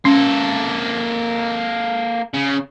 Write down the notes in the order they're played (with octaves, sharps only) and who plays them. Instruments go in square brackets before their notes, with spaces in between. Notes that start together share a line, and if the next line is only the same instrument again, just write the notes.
[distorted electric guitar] A#3 A4 [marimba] C#4
[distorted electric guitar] C#3